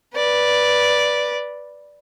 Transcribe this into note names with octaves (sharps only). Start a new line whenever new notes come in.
B4 D5